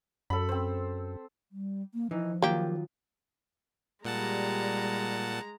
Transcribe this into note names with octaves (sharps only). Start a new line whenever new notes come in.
F#2 A4 B5
C4 C5
G3
A#3
E3 F3 D#4
D#3 F#3 A#3 F4 G4
A#2 G3 G#3 F#5 A5 A#5